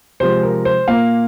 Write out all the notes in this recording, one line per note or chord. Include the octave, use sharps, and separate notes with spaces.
C3 F3 G#3 C5
A#4
C5
A#2 A#3 F5